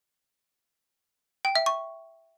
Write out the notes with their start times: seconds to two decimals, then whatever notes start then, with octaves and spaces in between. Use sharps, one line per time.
1.45 G5
1.55 E5
1.66 C#6